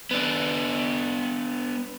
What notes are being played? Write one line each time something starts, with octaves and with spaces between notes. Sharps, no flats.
B3 D4